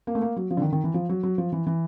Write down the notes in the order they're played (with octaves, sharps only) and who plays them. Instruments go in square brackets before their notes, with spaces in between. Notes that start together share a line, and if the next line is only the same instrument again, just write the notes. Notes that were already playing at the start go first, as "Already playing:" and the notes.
[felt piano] A#3
A3
A#3
F#3
F3
D3
D#3
D#3
E3
F3
F#3
F#3
F3
E3
E3